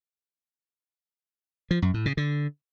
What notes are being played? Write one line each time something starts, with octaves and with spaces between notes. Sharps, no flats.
F3
F#2
A2
C#3
D3